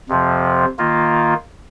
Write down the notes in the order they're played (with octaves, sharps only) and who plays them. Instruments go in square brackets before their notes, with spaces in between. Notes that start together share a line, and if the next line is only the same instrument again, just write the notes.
[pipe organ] F2 C3 F3
D#3 A#3 F4